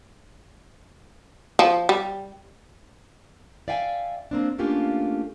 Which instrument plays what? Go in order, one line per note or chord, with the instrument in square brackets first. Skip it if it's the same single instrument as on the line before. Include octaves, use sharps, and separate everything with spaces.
[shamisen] F3
G3
[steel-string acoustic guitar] D5 E5 F5 G5 G#5
A#3 C4 D4
A3 A#3 C#4 D4 F4 G4